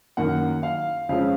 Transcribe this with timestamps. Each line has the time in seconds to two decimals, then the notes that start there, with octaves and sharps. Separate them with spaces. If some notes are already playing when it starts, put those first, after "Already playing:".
0.17 F#2 D#3 A#3 F#5
0.63 F5
1.09 F2 C#3 F3 G#3 C#4 F5